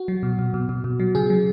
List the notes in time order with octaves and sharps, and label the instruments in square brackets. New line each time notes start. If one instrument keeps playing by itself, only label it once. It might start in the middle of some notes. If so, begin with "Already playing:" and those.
Already playing: [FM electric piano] F#4
F#3
B2
B2
B2
B2
B2
F#3
C#3 G#4
F#3